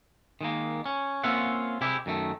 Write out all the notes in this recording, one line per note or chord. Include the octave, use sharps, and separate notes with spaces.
D#3 G#3 A#3
C#4
A#3 C4 C#4 F4 E5 F#5
C3 G#3 E4 G4
F#2 D#3 A3